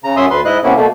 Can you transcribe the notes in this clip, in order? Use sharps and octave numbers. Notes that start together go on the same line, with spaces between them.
C#3 A#5
F#2 C#4 E5 C6 D#6
D2 B4 C6
G#2 E4 D#5 F#6
C3 A#3 B3 C#4 E4
B2 A3 A#3